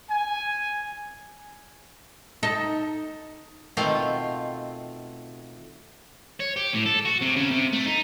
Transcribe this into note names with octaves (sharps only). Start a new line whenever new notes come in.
G#5
D#4 A4
B2 D#3 A3 C4 F4 F5
C#5
G4
A2
A4
F#4
C3
C#3
C3
A3
D#4